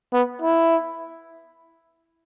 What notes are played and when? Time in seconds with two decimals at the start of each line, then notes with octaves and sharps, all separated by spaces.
0.14 B3
0.42 E4